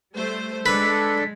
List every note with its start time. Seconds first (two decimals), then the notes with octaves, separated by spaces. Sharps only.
0.14 G3 A3 C5
0.66 G#3 D4 A4 B4 B6